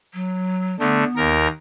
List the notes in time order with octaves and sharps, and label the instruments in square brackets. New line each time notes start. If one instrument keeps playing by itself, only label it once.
[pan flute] F#3
[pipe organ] D3 A3 [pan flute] B3
[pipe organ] D#2 A#4 A#6